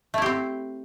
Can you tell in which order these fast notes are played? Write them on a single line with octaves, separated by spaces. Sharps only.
A3 E4 G4 C4